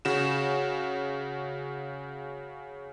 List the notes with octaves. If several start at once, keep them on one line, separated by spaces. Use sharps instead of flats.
C#3 F#4 E7